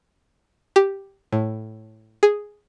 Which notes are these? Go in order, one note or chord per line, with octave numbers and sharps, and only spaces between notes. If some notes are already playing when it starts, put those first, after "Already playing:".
G4
A2
G#4